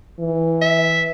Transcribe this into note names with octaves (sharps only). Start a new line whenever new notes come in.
E3
E5